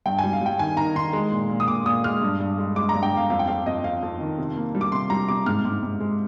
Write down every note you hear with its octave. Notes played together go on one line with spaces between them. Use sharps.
G2 G5
G#5
G3
F5
G3 G5
D#3 G#5
D#3 A#5
D#3 C6
G#3
A#2
A#2
D#6
A#2 D6
A#2 D#6
G#3 F6
G2
G2
G#3
G#3 D6
A#5
G2
G5
G2 F5
F2 F5
G5
F2 F5
F2 D#5
F2 F5
F2
D#3
C3
A#3
G3
D6
C3 C6
G3 A#5
C3 D6
G#2 F6
G#2
G#2
G#3